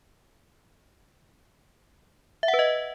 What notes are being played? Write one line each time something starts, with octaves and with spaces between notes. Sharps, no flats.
E5
F#5
B4
D#5